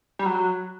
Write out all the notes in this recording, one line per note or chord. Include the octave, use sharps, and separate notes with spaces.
G3
F#3